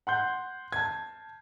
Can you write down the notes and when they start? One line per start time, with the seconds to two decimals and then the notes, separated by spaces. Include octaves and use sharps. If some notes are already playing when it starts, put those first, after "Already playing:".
0.07 F#5 C6 G6
0.72 A5 G#6